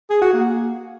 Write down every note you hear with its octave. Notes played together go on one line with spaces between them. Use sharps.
G#4
F#4
A#3